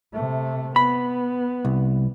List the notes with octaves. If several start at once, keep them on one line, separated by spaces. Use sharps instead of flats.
C3 A3
B3 B5
C2